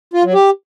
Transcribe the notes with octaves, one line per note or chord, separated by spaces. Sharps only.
F4
F#3
G4